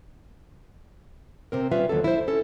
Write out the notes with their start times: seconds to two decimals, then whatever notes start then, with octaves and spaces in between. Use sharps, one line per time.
1.52 C3 C4 A#4
1.72 G3 C#4 F4 B4 E5
1.89 D#2 F#3 A4
2.04 E4 C5
2.28 C#4 A4